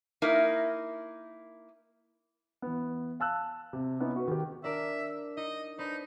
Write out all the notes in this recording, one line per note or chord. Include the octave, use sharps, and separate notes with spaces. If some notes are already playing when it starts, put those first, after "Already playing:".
A#3 D#4 E4 A#4
E3 B3
F5 A5 E6 F#6
C3
B3 C#4 D#4 E4
F#4 B4
D#3 G4
D4 A#4 D5 E5
D#4 D#5
D4 D#4 B4 C5